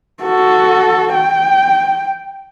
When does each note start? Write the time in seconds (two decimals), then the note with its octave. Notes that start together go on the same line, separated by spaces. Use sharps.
0.23 F#4 A4
1.14 G5